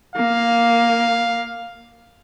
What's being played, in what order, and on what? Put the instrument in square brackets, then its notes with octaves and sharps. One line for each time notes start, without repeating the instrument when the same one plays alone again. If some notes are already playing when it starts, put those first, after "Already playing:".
[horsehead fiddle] A#3 [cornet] F5